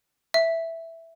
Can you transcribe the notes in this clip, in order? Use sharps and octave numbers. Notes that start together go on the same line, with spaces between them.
E5